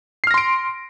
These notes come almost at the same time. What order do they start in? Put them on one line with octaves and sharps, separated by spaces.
C7 F6 A#6 C6 D7